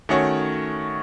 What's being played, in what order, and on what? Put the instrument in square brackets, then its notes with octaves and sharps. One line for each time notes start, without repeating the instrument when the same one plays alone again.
[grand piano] D#3 A3 C#4 F#4 C#5